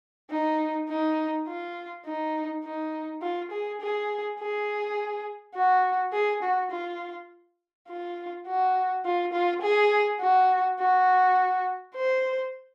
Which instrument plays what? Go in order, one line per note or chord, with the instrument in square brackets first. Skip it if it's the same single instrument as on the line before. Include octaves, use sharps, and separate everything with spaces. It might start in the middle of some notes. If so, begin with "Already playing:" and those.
[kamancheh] D#4
D#4
F4
D#4
D#4
F4
G#4
G#4
G#4
F#4
G#4
F#4
F4
F4
F#4
F4
F4
G#4
F#4
F#4
C5